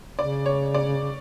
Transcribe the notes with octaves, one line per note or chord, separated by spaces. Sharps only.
C#3 D5
C#5
D5